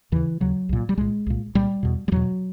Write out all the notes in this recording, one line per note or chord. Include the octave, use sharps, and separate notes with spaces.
D#2 C#3 E3
D#2 C#3 F#3
C2 A#2
G3
C2 A#2 G#3
C2 A#2
C2 A#2 G3
E2 B2
G3
E2 B2 F#3